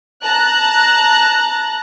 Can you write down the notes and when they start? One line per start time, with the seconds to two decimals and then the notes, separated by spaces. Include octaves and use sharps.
0.23 A5 A#5 F#6